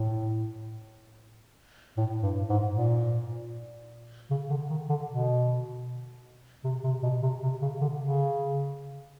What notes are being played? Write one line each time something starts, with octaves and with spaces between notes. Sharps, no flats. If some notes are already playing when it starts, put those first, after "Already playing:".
Already playing: A2
A2
G2
G#2
A#2
C#3
D3
D#3
D3
B2
C3
C3
B2
C3
C3
C#3
D3
C#3